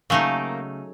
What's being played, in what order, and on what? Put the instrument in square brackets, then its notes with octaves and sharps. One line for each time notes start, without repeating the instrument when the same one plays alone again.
[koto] C#3 F#3 A3 D#4 [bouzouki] A#3